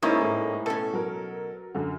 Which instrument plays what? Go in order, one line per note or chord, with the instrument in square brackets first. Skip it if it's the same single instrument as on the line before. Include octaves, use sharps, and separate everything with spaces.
[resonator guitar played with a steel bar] G#2 E4 [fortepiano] A#3 C#4 D#4 [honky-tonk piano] C#6 D#6
[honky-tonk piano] A2
[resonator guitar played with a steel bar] B2 C#4 [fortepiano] A4
[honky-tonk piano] F#3 A#4
F#2 D3